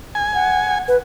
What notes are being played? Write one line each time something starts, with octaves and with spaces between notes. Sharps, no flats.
G#5
F#5
B4